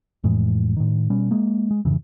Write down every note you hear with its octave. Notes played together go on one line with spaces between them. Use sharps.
F2 A2 E3 G#3
A2 D#3
B2 G3 C#4
G#3 A#3
G#3
F2 G#2 C#3 E3